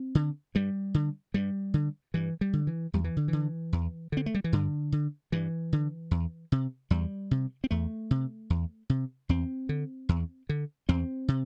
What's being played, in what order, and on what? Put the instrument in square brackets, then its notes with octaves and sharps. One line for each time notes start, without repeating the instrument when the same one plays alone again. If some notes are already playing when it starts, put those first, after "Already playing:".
Already playing: [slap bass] C4
D3
G2 G3
D3
G2 G3
D3
G2 E3
G3
D3
E3
E2 G3
E3
D3
D3 E3
E2
D3 C4
A3
G3
E3
G2 D3
D3
G2 E3
D3
E2
C3
E2 G3
C3
C4
E2 A3
C3
E2
C3
E2 C4
D3
E2
D3
E2 C4
C3